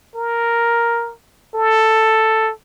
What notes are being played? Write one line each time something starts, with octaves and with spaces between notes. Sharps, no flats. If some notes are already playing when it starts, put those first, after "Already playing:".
A#4
A4